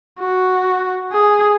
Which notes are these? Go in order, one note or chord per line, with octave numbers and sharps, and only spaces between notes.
F#4
G#4